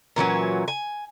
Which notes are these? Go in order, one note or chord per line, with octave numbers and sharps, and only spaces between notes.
A#2 E3 F#3 C#4
G#5